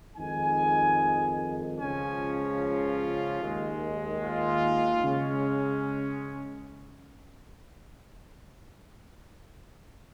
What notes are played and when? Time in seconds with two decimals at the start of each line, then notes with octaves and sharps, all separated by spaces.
0.17 F2 D#3 G#3 D#4 G#5
1.79 C#2 C#3 F3 C#4 G#5
2.61 F4
3.41 D#2 D#3 G#3
4.23 F4
5.04 C#3 G#3 C#4